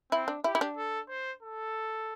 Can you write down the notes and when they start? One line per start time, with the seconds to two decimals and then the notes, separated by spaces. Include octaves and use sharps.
0.12 C4 E4
0.28 D4
0.44 E4 G4
0.55 E4
0.61 D4
0.77 A4
1.09 C5
1.42 A4